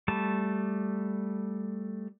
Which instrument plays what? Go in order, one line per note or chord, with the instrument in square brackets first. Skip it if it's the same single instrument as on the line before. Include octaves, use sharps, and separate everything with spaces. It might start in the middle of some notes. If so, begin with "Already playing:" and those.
[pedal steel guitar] G3 A3 A5